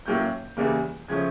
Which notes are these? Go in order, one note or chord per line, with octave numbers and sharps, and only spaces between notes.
A2 F#3 A#3 C#4 G6
E2 C#3 E3 G3 A#3
C#3 F3 A3 C#4 G#6